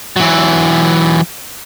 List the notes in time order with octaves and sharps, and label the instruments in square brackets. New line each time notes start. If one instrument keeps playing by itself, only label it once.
[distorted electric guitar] E3 F#3